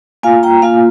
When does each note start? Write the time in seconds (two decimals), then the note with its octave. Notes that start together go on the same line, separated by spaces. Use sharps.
0.23 A#3 F4 F5 G#5
0.43 G5 A#5
0.62 A#3 F4 F5 G#5